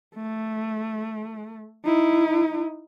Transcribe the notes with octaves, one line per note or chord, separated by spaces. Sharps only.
A3
D#4 E4